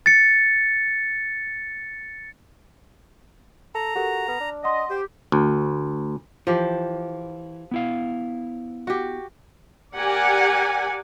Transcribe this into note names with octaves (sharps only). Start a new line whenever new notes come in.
A6 C#7
A4 A#5
F#4 G4 A4 A#4
B3 F6
D4
D#5 F#5 C6
G4 C5
D2
E3 F3 G4
B3 E4 F5
F#4 G4
G4 A#4 D5 F#5 G#5